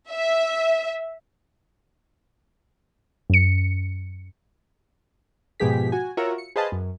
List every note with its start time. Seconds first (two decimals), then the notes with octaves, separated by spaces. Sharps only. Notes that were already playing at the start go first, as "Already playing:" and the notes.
0.10 E5
3.30 F#2 C#7
5.60 G#2 B2 F3 G4 G#4 B6
5.92 F#4 G#5
6.17 F4 F#4 A#4 C#5 E5 F#5
6.38 C#7
6.56 G#4 B4 C5 D#5 F5 A5
6.72 F#2